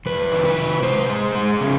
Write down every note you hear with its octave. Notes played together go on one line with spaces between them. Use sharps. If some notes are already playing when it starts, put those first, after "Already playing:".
F2 B4
D#3
B4
C3
G#3 C5
G#3
G#3
C#3